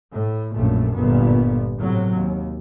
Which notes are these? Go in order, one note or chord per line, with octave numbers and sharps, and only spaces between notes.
A2
A#1 F#2 A#2 A3
G1 A#2 B3
A2 C3 F#3
D#2